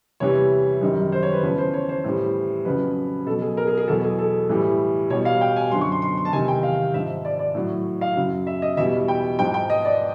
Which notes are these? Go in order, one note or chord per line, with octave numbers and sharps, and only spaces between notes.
E2 C3 E3 G3 C#5
F#2 D#3 G3
C5
C#5
B4
E2 C#3 F3 B4
C5
C#5
C5
A2 E3 G3
F2 C#3 F#3 B4
B2 F#3 A4
G#4
A#4
G#4
G#4
E2 B2 F#3 A4
G#4
A4
A2 E3 G3
B2 G3 C#5
F5
G5
G#5
F#2 D3 F3 C6
C#6
C6
C6
C6
A5
E2 C3 D#3 G#5
G5
F5
G#2 F3 E5
D5
D5
A2 F#3
F5
F#2 C#3 F#3
E5
D#5
E2 B2 G3 E5
G5
G#2 F3 G5
G5
D#5
D5